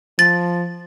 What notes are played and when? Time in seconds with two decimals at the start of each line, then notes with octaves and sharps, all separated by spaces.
0.19 F3 A6